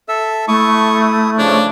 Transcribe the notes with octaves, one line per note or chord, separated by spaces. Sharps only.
A4 E5 E6
A3 E4 C#6 D#6
C#3 F3 D4 C#5